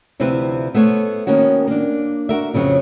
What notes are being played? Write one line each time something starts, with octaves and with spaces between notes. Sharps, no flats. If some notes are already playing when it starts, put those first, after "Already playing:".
D2 C3 F3 C4 E4 B4
A3 B3 C5 C#5
D#3 A#3 B3 C#4 F#4
A#3 D4
F#4 A#4 E5
F2 C#3 F3 F#3 B3